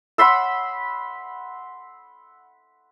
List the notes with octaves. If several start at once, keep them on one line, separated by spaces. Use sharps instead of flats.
F#5 B5 C6 E6